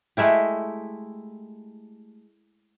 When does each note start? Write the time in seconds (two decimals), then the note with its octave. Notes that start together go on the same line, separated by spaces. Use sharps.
0.17 G#3 A3 E4 G4